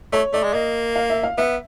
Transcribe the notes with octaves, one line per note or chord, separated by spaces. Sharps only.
A3 C#5
A3 D5
G#3
A#3 D#5
F5
E5
F5
B3 E5